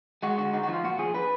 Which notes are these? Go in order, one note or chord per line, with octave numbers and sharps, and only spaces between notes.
G#3 F#4
D3 F#4
D#4 F#4
F#4
F3 F4
A#2 F#4
F3 G#4
D4 B4